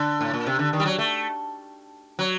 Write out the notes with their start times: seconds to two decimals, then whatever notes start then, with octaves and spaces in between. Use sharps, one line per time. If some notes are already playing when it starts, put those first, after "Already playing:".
Already playing: D3
0.21 A2
0.34 A#2
0.47 C3
0.59 D3
0.73 D#3
0.80 G3
0.85 F#3
0.98 A3
2.19 F#3